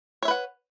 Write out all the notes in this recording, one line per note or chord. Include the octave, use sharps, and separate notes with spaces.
B4 C#5 E5 F#5